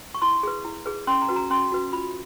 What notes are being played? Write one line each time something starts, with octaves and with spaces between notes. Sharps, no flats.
C#6
E4 C6
G#4 B4
E4
G#4 B4
C#4 C6
A#5
F#4 B4
A#5
C#4 C6
F#4 B4
F4 B5